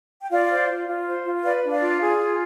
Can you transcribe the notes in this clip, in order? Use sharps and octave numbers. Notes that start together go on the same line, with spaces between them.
G5
F4 D5 F5
C5
F4
F4
C5
F4
B4 D5 F5
D4
D5 F5
F4
G#4
F4